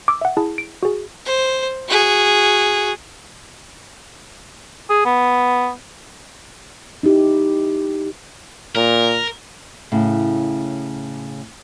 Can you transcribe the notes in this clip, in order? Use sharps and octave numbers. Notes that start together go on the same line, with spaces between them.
D6 E6
E5 F#5
E4 G#4 A5
D7
F#4 G#4
C5
F#4 G#4
G#4
B3
D#4 E4 G4
A#2 A#4
A2 C#3